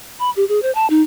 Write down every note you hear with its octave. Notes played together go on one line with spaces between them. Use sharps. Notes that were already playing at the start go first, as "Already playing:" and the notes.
B5
G4
G#4
C5
A5
D#4